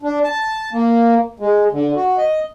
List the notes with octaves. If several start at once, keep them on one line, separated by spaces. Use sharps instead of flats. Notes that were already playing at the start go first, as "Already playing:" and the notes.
D4
A5
A#3
G#3
D3
F#4
D#5